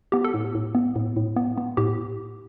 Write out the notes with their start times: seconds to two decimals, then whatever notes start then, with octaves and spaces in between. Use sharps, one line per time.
0.12 B3 G4
0.24 A4
0.34 A2
0.55 A2
0.75 B3
0.96 A2
1.16 A2
1.36 B3
1.58 B3
1.77 A2 G4